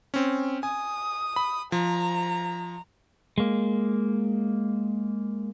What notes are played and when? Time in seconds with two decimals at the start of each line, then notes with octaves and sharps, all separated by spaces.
0.14 C4 C#4
0.63 G#5 D#6
1.36 B5
1.72 F3 A#5
3.38 G#3 A#3